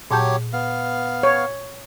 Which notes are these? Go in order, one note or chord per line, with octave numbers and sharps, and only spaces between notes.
A#2 F#3 G4 C#5 A5 G6
B3 F5
C#5